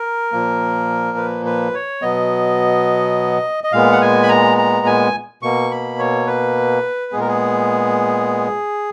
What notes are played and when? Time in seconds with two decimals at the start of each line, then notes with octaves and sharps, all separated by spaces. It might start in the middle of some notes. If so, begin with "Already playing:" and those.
Already playing: A#4
0.32 A#2 F3 A#3
1.17 B4
1.46 B4
1.74 C#5
2.02 B2 F#3 B3 D#5
3.64 D#5
3.72 A#2 G#3 B3 F5
3.92 F#5
4.01 G#5
4.23 B5
4.29 A#5
4.58 A#5
4.86 G#5
5.43 B2 A#3 C#6
5.71 B5
5.99 C#5
6.27 B4
7.12 A#2 G#3 B3 G#4
7.20 A#4
7.27 G#4